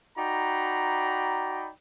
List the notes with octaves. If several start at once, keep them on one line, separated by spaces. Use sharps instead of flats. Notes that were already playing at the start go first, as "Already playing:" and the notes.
D#4 F#4 D5 G5 A#5 B5